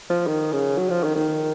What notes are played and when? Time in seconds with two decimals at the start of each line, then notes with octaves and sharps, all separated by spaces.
0.10 F3
0.27 D#3
0.53 C#3
0.78 F#3
0.90 F3
1.04 D#3
1.16 D#3